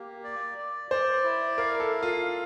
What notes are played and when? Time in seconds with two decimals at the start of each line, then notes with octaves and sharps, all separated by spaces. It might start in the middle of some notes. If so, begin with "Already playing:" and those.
Already playing: A#3 G4 A#4
0.24 D5
0.58 D5
0.91 C5 D5
1.24 E4
1.58 A#4 F5
1.80 A4
1.92 F5
2.03 F4
2.25 F5